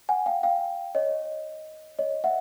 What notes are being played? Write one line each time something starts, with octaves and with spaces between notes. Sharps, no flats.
F#5 G#5
F5 G5
F5 G5
C#5 D#5
C#5 D#5
E5 F#5